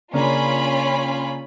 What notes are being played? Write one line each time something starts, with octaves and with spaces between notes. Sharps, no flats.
C#3 A#3 C#4 D4 F4 B5